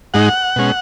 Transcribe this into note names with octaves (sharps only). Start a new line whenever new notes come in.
G#2 G#3 D#4 F#5
B2 G#3 C#4